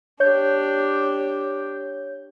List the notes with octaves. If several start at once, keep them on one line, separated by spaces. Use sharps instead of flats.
D4 G4 C#5 G6